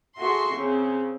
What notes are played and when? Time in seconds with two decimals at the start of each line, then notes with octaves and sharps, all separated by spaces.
0.18 F#4 G#4 A4 E5 C6 C#6
0.55 C#3 C4 C#4